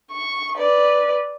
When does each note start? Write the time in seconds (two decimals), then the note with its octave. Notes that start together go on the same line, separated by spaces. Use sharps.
0.11 C#6
0.56 B4 D5